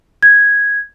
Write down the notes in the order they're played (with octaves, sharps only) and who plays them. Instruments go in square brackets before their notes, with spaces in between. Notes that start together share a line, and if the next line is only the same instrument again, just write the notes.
[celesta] G#6